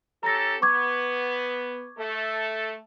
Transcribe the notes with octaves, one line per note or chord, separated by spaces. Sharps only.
C#4 G4 A4 A#5 A#6
B3 C#6 D6 G#6
A3 A4